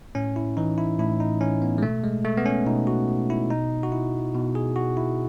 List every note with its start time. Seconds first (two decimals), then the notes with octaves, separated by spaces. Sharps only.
0.15 A2 C#4
0.36 E4
0.57 E3 D#4
0.78 E4
0.99 A2 E4
1.20 D#4
1.41 E3 C#4
1.62 B3
1.78 G#3
1.82 B2 A3
2.04 G#3
2.25 A3
2.37 B3
2.46 C#4
2.66 B2 D#4
2.87 F#4
3.30 E4
3.50 B2 D#4
3.83 F#4
3.92 E4
4.34 B2
4.55 G#4
4.76 F#4
4.97 E4